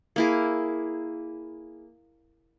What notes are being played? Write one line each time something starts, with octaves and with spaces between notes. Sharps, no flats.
A#3 E4 G#4